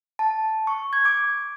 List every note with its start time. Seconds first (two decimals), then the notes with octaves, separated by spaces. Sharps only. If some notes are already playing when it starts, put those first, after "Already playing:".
0.19 A5
0.67 C#6
0.93 G#6
1.05 D6